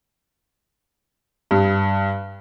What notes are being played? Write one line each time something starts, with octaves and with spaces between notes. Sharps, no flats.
G2